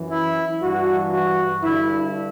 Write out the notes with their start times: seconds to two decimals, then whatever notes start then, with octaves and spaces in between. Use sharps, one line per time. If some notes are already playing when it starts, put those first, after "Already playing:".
Already playing: F#2 E3
0.11 E4
0.61 G2 E3 F#4
1.12 F#4
1.62 G2 D3 E4